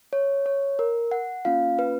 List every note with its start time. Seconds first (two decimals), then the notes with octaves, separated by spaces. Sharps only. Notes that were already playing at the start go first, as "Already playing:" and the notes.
0.13 C#5
0.46 C#5
0.79 A#4
1.12 F#5
1.45 A#3 C#4 F4 F5
1.79 B4